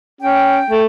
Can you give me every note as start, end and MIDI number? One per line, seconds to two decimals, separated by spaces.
0.21 0.59 61
0.21 0.81 79
0.70 0.86 57